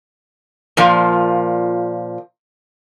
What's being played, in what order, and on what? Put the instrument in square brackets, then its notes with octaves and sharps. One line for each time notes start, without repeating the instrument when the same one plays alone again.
[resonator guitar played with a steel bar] A#2 F3